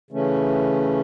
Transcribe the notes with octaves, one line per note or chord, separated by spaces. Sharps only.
C#3 E3 A3 C#4